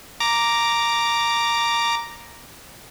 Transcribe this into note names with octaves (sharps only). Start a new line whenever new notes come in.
A#5 D6